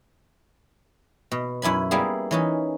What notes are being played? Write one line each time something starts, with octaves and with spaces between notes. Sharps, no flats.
B2
F#2 E4 G#5 B5
G3 A#3 B3 E4 G#4
E3 C#4 D#4